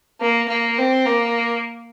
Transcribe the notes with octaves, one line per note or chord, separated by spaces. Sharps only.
A#3
A#3
C4
A#3